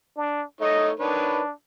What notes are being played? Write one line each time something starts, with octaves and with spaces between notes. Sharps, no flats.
D4
A3 D#4 C#5 D#5
D#3 D4 B4 C#5